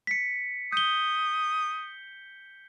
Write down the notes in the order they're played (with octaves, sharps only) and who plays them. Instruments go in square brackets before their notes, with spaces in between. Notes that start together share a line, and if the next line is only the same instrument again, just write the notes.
[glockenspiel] B6 C#7
[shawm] D#6 [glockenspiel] G6 G7